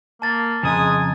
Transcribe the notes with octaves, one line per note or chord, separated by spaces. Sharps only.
A#3 A5 A6
F2 C#3 G#3 G#5 A#5 D#6